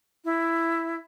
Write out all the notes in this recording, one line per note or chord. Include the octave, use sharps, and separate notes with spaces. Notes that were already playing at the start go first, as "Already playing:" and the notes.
E4